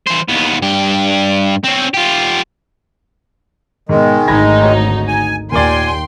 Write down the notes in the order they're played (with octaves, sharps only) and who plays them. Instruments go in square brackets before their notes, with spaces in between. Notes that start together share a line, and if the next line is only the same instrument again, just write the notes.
[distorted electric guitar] E3 C5
D#2 B3
G2 G4
C4 C#4
F4 G4
[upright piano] G#2 B2 [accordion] D#3 G#3
[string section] G#1 D2 D#4 [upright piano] B5 G#6 A#6
[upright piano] F#4 C#5
[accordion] G#5
[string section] D#2 G5 C6 [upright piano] A#2 A#4 D5 [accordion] G#5